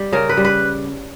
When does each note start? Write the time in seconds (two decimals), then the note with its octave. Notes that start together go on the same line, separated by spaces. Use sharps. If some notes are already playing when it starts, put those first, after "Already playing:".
Already playing: G3
0.13 C#3 A#4
0.29 B4
0.37 G3
0.45 B4